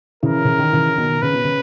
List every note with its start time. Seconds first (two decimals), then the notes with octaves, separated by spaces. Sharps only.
0.23 C#3 E3 A#4
0.45 C#3
0.59 D#3
0.73 C#3 E3
0.98 B2 D#3
1.22 C#3 B4
1.33 B2
1.44 C#3